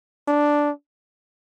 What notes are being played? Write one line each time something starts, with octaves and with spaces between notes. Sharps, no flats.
D4